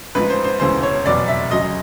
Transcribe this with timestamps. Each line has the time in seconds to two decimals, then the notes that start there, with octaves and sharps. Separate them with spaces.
0.15 A1 G#2 F3 B4
0.30 C5
0.45 C5
0.60 E1 D2 C#3 E3 C5
0.83 C#5
1.06 F1 E2 B2 F#3 D5
1.28 E5
1.51 D2 C#3 F#3 D#5